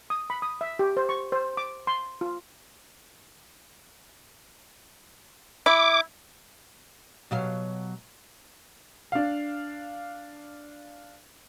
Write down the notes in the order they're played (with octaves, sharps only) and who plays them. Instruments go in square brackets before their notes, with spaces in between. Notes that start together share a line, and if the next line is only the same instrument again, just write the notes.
[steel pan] D#6
B5
D#6
E5
G4
C5
C#6
C5
D6
C6
F4
[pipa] E4 [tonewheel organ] D6
[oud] B2 F#3 F5
[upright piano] D4 F5